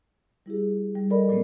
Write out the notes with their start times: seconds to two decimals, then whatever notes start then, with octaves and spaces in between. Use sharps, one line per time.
0.46 G3 E4 G4 G#4
0.95 G3 G5
1.10 A4 A#4 D5 D#5 B5
1.29 A#2 F#3 G3 A3 A#3 C4